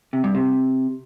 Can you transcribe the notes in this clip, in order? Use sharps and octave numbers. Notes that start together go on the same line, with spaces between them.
C3
G2
C3